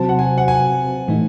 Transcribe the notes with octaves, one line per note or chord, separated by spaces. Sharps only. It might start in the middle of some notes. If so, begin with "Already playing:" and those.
Already playing: C3 F#3 C4 F#4 C5 A5
F#5
G#5
F#5
G#5
A2 E3 A3 D#4